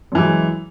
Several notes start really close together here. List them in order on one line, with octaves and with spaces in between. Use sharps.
F#2 E3 G#3